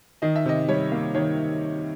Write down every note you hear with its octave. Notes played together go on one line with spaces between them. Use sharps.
D#3 D#5
E5
C3 D#5
G3 C#5
A#3
D#3 C#5